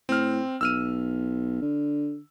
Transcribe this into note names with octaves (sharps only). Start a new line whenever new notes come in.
A2 C4 F6
B1 E6 F6 D#7
D3